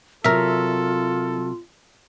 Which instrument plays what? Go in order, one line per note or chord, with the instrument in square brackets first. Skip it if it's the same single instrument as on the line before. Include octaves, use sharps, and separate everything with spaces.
[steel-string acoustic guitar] C3 F#3 [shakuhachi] F4 [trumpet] A4 [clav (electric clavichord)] A#4 E5